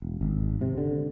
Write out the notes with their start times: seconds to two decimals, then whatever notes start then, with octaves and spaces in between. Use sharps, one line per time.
0.02 E1
0.21 G#1
0.61 C3
0.78 D3